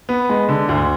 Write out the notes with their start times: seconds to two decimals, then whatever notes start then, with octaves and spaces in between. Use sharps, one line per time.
0.09 B3
0.29 G#3
0.49 D3
0.69 D2